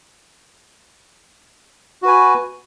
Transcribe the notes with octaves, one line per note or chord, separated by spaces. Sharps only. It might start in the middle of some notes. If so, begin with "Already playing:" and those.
F#4 B4 G#5